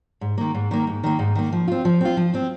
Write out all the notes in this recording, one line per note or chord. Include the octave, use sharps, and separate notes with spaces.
G#2
D#3 A#3
G#2
D#3 A#3
G#2
D#3 A#3
G#2
D#3 A#3
F3
C4 F4
F3
C4 F4
F3
C4 F4